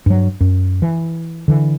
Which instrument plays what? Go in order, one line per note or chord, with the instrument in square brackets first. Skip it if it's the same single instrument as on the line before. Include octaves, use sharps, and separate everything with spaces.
[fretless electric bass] G2 F#3
F#2
E3
D3 E3